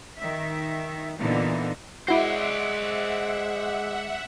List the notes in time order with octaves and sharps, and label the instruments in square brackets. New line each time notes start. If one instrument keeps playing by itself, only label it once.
[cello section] D#3 E5
A#2 D3 E3 B3 D#4
[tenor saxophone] G#3 [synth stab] E4 F#4 [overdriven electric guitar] C5 D5 [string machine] E5 F#5